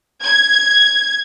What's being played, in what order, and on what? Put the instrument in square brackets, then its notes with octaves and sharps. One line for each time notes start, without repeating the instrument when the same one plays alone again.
[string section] G#6